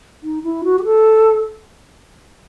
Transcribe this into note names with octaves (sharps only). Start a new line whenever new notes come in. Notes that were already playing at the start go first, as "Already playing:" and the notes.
D#4
E4
F#4
G4
A4